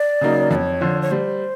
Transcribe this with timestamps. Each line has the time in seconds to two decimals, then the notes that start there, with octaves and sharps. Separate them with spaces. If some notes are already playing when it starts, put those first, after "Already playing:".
Already playing: D5
0.21 C#3 F#3 A#3 D#4
0.51 F2 D5
0.55 C#5
0.81 D3 F3
1.02 C#5
1.11 G3 C5